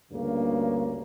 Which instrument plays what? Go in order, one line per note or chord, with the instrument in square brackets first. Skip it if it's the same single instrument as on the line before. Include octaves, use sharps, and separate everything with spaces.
[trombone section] D2 G2 C#3 A#3